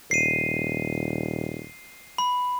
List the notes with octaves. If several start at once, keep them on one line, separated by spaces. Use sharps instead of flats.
D#1 C7 D#7
B5